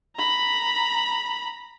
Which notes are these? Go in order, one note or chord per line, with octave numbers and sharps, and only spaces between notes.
A#5 B5